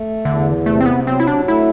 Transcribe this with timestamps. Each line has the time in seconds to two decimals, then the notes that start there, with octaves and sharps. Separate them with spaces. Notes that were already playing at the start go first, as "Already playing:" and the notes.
Already playing: A3
0.25 E2 D3
0.66 C3 A3
0.81 C4
0.86 B3
1.07 F#3 C4
1.20 E4
1.27 D4
1.47 A3 E4